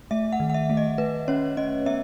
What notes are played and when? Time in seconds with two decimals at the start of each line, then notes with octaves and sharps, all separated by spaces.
0.11 A3 E5
0.32 F#5
0.40 D#3
0.50 F#5
0.54 E5
0.70 A3
0.77 D#5
0.98 A3 B4
1.28 C#4 C#5
1.57 C#4 D#5
1.86 B3 E5